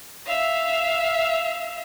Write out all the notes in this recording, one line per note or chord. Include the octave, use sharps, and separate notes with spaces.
E5 F5